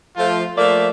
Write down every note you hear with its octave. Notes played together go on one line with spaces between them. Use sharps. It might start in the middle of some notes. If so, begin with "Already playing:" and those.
F3 A3 F4
F3 A3 A#3 D5 E5 F5